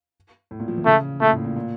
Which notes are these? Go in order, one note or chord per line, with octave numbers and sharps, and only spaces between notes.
A2
A#2
F3
E3
C#3 A3
A#2 A3
A2
A#2
A#2